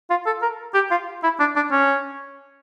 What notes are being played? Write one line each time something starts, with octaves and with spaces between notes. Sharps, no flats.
F4
A4
A#4
G4
F4
E4
D4
D4
C#4